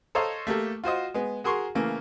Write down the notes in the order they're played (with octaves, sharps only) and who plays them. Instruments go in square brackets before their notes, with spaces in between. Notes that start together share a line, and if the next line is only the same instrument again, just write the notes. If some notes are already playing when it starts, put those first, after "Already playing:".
[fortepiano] A4 C5 C#5 D#5 F5 A#5
A3 A#3 G4 A4
F4 F#4 C5 D#5
G#3 B3
F#4 G#4 A#4 C6 C#6
C#3 E3 A3 A#3